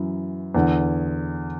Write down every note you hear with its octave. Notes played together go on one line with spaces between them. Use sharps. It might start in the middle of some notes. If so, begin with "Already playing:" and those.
Already playing: F#2 E3
E2 D3